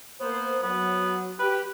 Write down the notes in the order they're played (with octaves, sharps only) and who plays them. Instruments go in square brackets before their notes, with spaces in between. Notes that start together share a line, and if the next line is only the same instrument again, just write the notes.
[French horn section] A#3 A#4 C5 [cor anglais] B3
[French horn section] F#3 [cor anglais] B3
[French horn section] G4 [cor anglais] B4